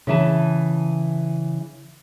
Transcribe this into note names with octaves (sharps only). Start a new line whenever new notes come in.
C#3 E3 A5